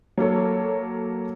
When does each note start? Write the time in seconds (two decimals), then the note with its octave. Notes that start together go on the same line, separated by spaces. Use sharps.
0.18 F#3 A#3 A4 C#5